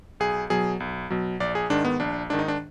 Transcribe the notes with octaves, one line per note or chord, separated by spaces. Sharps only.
B1 G#4
B2 F#3 G#4
B1
B2 F#3
A#1 D5
G#4
G#2 D#3 D4
B3
A#1 D4
G#2 D#3 D4
D#4
D4